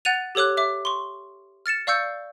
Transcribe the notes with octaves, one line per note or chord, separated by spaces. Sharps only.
F#5 F#6 A6 D#7 F7
G4 A4 C#5 D6 F#6
E5 D6
C6 C#6
F6 A6 C#7 E7
D5 F5 C#6 E6 G6 C#7